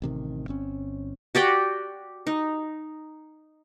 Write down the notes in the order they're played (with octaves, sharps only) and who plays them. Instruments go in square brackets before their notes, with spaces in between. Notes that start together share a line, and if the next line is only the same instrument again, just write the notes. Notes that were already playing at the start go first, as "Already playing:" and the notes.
[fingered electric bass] A1 C3 D#3
G1 C4 C#4
[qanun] F#4 G4 D5 G5
D#4